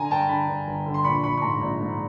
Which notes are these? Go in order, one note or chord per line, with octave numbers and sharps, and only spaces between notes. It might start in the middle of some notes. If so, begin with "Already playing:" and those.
Already playing: D3 G#5 A#5
G2 G5 A5
D3 A5 B5
G2
G1
D3
C6
A#1 B5 C#6
A#1 B5 C#6
C#6
G#2 A#5 C6
A#1
G#2